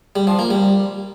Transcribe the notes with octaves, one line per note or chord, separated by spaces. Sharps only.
G3
F3
A#3
G3